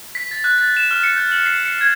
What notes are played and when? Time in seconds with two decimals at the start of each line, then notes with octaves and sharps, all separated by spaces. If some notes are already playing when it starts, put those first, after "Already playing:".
0.15 B6
0.31 A6
0.44 F#6
0.58 A6
0.77 E7
0.91 F6
1.04 C#7
1.17 G6
1.32 F#7
1.46 C7
1.66 C#7
1.81 G#6